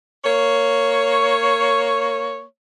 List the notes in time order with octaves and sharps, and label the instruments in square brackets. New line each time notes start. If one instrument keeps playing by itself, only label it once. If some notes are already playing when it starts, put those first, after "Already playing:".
[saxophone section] A#3 C#5